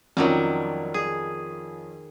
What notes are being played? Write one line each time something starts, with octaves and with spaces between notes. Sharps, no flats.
F2 D#3 F#3 G3 C#4 F4
G#4